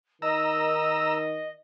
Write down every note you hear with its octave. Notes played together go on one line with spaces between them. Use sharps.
D#3 D#5 A#5 E6